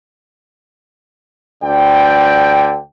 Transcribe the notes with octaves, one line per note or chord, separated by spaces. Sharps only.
D2 D3 D5 G5